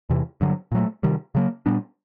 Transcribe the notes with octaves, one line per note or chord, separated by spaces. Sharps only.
E2 C3 E3
G2 D3 F#3
A#2 F#3 A3
C3 D#3 G3
C#3 F#3 A#3
A#2 G3 B3 D4